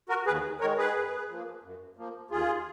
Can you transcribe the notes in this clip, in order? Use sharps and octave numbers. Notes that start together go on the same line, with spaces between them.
F#4 A#4
D#2 G#4 B4
D#3 G#3 A#4 C#5
G#4 B4
F#2
F3 A#3
F#2
F3 A#3
D#2 F4 G#4